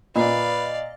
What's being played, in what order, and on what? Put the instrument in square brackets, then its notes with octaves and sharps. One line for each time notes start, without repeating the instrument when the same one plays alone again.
[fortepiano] A#2 [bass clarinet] B4 [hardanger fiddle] D5 F5 [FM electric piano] D#5